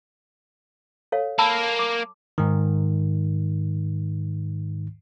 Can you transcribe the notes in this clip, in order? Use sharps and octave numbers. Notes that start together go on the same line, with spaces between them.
A4 C#5 F5
A#3 A5 B5 E6
D6
G#2 D#3